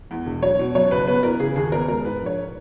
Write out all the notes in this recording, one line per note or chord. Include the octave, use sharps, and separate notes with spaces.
E2
E1
F#3 C#5
B2
F#2 C#5
F#1 B4
B3 B4
E3 A#4
C#3 G#4
D#2 G#4
B3 A#4
G#3 A#4
G#2 B4
A#1
C#5